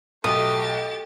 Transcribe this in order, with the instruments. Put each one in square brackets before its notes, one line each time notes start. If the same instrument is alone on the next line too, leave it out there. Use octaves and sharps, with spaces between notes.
[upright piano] B1 [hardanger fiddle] A3 [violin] G4 A6 [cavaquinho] D#6